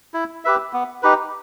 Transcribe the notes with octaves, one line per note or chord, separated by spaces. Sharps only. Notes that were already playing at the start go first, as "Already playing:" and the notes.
E4
G4 B4 E5
B3
D#4 G4 B4